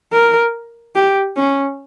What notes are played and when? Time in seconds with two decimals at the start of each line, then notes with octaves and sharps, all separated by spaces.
0.12 A#4
0.96 G4
1.37 C#4